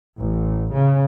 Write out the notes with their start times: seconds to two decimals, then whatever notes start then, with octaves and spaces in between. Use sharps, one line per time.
0.19 A1
0.73 C#3